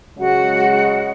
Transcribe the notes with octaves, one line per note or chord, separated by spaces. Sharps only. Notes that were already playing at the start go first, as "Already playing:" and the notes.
C#3 F#3 G#3 F#4 F#5